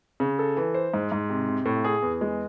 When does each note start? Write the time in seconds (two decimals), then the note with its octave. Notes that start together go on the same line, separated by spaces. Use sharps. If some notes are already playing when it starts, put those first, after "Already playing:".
0.20 C#3
0.39 A4
0.57 E3
0.74 C5
0.94 G#2
1.12 G#2
1.30 C3
1.48 C3
1.65 A2
1.84 G#4
2.02 E2
2.21 G#3